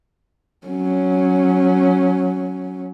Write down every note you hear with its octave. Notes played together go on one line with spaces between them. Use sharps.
F#3 C#4